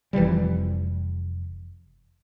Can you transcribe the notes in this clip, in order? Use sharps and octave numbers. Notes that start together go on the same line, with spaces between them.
F1 E3 F3 G3